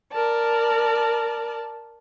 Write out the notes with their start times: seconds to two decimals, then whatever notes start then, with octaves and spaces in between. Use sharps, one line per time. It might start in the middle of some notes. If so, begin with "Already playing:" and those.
0.11 A#4 D5 A5